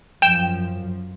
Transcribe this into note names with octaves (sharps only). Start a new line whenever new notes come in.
F#2 F3 G5 E7